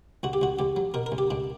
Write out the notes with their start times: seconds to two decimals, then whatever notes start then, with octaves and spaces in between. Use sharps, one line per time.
0.23 C#2 F#4
0.33 G4
0.41 C#2 F#4
0.59 C#2 G4
0.76 F#3
0.94 B2 A#4
1.06 A#4
1.12 C#2
1.18 G4
1.31 C#2 D4